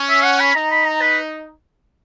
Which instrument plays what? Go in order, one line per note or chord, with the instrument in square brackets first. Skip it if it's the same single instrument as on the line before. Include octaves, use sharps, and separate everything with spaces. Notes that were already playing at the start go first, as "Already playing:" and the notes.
Already playing: [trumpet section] C#4
[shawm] E5
F#5
B5
[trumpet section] D#4 [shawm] A#5
[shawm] B5
A#5
B4